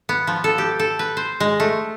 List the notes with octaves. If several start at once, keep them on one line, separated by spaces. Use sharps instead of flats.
B3
F3
A4
G4
A4
B4
C5
G#3
A3